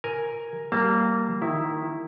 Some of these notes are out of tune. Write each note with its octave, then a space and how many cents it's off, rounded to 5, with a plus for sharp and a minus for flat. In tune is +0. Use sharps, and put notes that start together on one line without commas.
A#4 +0 G#5 +0
G3 -25 A#3 -15 A5 +20
D#3 +0 E4 -5